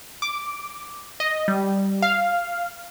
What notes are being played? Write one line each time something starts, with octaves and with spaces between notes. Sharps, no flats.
D6
D#5
G3
F5